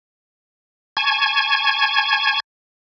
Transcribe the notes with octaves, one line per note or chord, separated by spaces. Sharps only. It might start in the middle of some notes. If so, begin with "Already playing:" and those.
G#5 A5 C#6 G#6